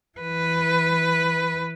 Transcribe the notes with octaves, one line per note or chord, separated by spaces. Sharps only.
E3 B4